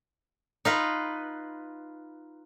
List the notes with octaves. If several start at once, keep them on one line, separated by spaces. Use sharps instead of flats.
D#4 F4 B4